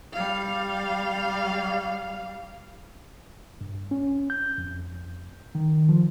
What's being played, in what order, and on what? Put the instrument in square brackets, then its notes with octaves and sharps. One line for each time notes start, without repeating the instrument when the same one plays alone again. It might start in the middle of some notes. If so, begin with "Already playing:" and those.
[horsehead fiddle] G3 F5
[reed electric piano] G2
C#4
G6
F2
D#3
F3